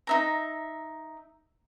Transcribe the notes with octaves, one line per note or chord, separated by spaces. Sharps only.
D#4 E5 A#5